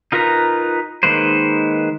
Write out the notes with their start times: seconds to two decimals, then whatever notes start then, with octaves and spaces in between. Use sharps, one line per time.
0.12 D#4 F4 A#4 B4 A#5
1.03 D#3 G#3 A#3 B4 C5